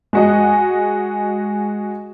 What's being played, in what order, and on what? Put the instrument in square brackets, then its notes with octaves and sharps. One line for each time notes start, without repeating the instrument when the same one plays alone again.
[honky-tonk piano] G#3 F#4 D#5